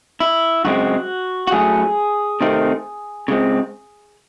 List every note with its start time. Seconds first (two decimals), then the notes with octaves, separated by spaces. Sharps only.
0.20 E4
0.65 F#2 C#3 G#3 C4 F#4
1.47 F#4
1.52 A2 F#3 A3 C#4 G#4
2.41 C3 D#3 A3 C4
3.28 C#3 G#3 C4